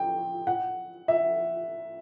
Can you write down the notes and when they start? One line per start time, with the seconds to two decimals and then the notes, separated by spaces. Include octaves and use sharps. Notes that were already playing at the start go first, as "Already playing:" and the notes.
Already playing: G5
0.47 F#5
1.08 E5